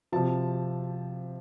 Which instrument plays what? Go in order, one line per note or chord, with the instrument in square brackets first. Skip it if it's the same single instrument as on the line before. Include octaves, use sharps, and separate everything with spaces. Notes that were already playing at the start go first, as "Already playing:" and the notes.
[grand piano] C3 F3 A5